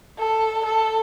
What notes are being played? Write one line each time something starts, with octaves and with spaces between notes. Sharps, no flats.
A4
A4